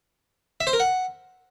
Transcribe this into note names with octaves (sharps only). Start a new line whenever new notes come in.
E5
C5
A#4
F#5